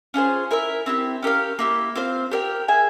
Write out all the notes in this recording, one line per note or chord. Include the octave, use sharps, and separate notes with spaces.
C#4 F4 G#4 C5
E4 A#4 E5
C4 E4 G4
C#4 G4 A#4 F5
A#3 E4 G4
C4 F4 C5 F5
G4 A#4 E5 G5
G#4 E5 G#5